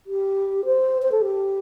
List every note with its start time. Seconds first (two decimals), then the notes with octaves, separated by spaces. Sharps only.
0.07 G4
0.65 C5
1.02 C5
1.12 A4
1.21 G4